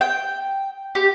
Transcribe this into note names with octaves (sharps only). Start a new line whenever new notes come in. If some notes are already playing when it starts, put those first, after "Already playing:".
G5
G4